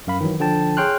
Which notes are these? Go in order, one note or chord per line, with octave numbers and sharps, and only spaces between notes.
F#2 F5 B5
D#3 E3 F#3
D3 F3 G5 A5
G#4 C#5 G5 C6 F6 F#6